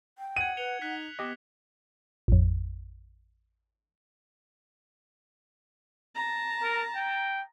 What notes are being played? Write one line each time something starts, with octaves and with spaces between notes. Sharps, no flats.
G5
F#5 G#6 D#7 F#7
B4 C#7 F7 G7
D#4 F#6 B6
B3 G4 D#5 D6
A1 F2
A5 A#5
A#4
G5